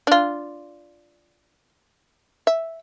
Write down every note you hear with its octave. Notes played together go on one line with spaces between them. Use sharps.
D4 F4
E5